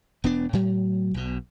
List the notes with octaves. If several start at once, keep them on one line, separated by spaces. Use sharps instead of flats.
E1 B3 D4
A2 F#3
B1 B2